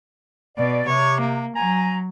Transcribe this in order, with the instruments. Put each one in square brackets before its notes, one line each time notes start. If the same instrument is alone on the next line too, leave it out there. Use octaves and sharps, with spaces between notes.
[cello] B2 [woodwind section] D5
[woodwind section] C3 [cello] C#5
[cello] A#3
[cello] F#3 [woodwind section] G#5 A#5